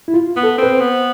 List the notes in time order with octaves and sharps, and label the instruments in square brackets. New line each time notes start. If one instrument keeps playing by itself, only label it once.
[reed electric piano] E4
F4
[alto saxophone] B3
[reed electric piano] A4
[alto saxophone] C4 [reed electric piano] B4
[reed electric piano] C5
[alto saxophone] B3